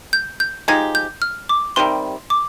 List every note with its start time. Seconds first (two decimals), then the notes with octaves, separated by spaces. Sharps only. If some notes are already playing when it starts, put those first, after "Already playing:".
0.13 G6
0.40 G6
0.68 F3 G#3 D#4 G4 G#6
0.95 G6
1.22 F6
1.49 D6
1.76 C3 D#3 G3 C6
2.30 D6